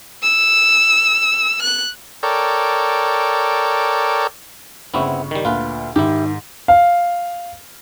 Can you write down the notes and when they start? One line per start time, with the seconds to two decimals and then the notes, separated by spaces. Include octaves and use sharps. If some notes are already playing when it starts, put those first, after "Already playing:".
0.22 E6
1.63 F#6
2.23 A4 A#4 C#5 D5 G5
4.94 G1 C#3 B3 C4 E4 C#6
5.31 D#3 G3
5.45 D2 A#2 F4 B4 F5
5.96 G#2 D#3 E4 G4
6.68 F5